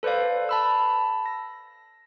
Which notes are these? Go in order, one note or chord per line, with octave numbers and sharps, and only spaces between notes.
A4 B4 C5 D5 F5
A5 B5 E6
A#6